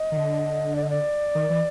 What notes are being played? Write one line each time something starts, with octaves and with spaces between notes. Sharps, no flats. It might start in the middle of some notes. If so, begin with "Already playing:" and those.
Already playing: D#5
D#3
D3
D5
D#5
D5
D#3
E3